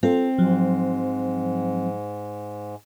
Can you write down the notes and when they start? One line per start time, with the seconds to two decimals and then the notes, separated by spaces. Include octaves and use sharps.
0.03 C4 F4 A4
0.38 G#2 F3 F#3